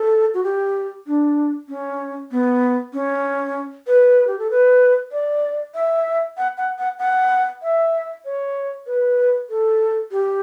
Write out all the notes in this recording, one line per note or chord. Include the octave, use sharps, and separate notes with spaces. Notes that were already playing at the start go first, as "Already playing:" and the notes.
Already playing: A4
F#4
G4
D4
C#4
B3
C#4
B4
G4
A4
B4
D5
E5
F#5
F#5
F#5
F#5
E5
C#5
B4
A4
G4